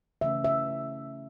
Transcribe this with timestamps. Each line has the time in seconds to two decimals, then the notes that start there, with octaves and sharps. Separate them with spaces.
0.21 C#3 E3 A3 C#4 E5
0.44 E5